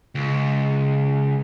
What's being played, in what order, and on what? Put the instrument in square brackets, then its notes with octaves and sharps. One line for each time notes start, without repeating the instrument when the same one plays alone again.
[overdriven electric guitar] C#2